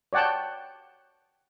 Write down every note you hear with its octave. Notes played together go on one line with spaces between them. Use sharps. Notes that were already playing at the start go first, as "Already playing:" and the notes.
C#5 D5 F#5 G5 A5